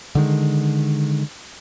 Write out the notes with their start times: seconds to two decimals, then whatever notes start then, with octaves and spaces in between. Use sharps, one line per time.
0.15 D3 D#3 G#3